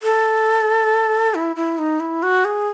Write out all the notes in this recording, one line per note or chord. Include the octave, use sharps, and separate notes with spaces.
A4
E4
E4
D#4
E4
F#4
G#4